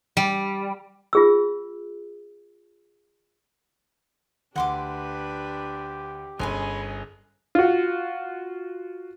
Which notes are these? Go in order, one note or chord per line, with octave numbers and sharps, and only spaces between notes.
G3
F4 G#4 E6
D2 D4 G4 B4 F#5 C6 D6
G1 C#4 G#4 B4 D#5 G#5 C6
F4 F#4